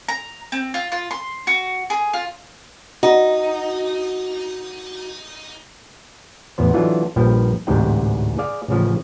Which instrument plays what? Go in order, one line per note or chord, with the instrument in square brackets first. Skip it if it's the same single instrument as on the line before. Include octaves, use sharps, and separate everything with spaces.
[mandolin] A#5
C4
F4
F4
C6
F#4
G#4
F4
[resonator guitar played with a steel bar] D#4 [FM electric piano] F#4
[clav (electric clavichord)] A1 E2 B3 C5
E3 F#3 D4 F4 A4
A#1 G2 F3 B4 G5
A1 D2 G#2 C3 C4 G5
G#4 D5 F5
A1 C#3 F3